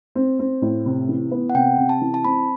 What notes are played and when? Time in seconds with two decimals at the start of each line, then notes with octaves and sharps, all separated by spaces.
0.15 C4
0.39 C4
0.62 A2
0.86 C3
1.09 E3
1.31 B3
1.50 F#5
1.55 C3 G5
1.78 C3
1.89 A5
2.01 E3
2.14 A5
2.25 C4 B5